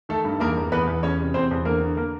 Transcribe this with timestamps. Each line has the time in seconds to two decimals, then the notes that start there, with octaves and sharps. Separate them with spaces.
0.09 D#3 A3 A4
0.25 G2
0.40 E2 A#3 A#4
0.57 E2
0.72 E2 B3 B4
0.87 E2
1.03 E2 C#4 C#5
1.19 C3
1.34 E2 C4 C5
1.51 E2
1.65 D3 A#3 A#4
1.81 D3
1.97 D3 A#3 A#4